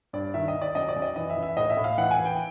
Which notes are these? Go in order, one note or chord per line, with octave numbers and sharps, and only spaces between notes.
G2 D5
D#3 E5
D#5
D#3
D5
F#2 D#5
D5
F#2
D#5
E3 D#5
E5
E3
E5
A2 D#5
E5
A2
F5
E3 F#5
G#5
E3
G5